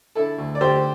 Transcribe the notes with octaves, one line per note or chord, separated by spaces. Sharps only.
D3 E4 A4
D2
D5
D2 G4 C5